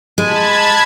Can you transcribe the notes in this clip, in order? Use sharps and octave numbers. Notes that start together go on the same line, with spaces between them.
G#3 A5 B5 G#6